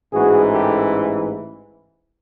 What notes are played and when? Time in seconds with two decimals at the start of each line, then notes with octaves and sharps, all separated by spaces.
0.13 A1 G#2 E3 F#4 G#4
0.52 G4 A4